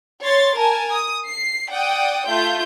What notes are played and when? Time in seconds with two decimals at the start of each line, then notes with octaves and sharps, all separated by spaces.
0.23 C#5 C6 A6
0.57 A#4 G#5 A5
0.93 D#6
1.24 C7
1.69 D5 F#5 G5 D#6
2.26 A3 F4 G6